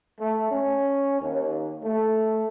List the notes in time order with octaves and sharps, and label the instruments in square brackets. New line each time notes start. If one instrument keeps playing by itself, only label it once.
[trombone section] A3
C#4
D#2
A3